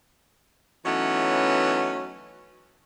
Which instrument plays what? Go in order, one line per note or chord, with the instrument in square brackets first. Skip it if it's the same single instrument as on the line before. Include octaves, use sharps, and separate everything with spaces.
[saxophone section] E3 F#3 A3 B3 C#4 D#4